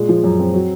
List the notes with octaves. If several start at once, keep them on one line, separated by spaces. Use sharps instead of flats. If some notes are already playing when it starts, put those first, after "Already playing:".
Already playing: A#2 G#3
F3
F#2
C4
F#3